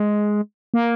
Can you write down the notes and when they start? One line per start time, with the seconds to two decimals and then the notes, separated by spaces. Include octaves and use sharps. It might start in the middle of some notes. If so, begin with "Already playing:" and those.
Already playing: G#3
0.74 A#3